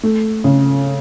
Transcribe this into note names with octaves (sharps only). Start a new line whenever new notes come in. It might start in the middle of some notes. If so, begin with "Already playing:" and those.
A3
C#3